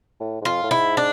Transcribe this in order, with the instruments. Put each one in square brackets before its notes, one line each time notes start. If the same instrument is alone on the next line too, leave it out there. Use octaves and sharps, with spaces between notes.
[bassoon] A2
G#2
[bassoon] F2 [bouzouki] F4
[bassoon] A2
[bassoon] G#2 [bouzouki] E4
[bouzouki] D4